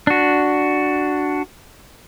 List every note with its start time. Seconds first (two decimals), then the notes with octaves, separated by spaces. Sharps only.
0.07 D4 F#4